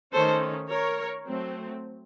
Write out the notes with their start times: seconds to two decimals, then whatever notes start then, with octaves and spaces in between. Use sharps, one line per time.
0.13 D#3 A3 C#4 A4 C5
0.70 A#4 C#5
1.28 F#3 A3 C4